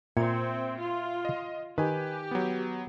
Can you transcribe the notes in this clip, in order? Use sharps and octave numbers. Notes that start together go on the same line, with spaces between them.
A#2 C4 E5 G#6 C#7
F4
D#5
D#3 G4 B4 G#5
F#3 B3